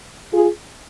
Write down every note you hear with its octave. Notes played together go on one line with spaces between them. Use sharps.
F4 G#4